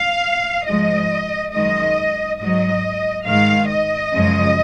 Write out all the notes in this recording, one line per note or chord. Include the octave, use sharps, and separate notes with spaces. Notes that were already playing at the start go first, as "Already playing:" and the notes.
Already playing: F5
G#2 F3 G#3 D#5
F#2 D#3 G#3 D#5
G#2 F#3 D#5
G#2 D#3 G#3 F5
D#5
F#2 C#3 F3 G#3